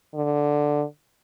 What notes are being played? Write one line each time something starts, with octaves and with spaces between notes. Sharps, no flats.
D3